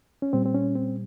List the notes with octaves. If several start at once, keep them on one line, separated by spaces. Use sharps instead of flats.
C#4
A#2 G3 C4
C4
C#4
C4